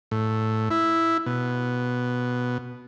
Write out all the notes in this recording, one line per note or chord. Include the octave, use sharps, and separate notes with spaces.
A2
E4
B2